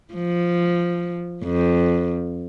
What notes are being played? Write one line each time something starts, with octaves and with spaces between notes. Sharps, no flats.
F3
F2